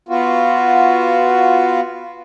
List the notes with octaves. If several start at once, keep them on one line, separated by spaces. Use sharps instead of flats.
B3 F4 F#4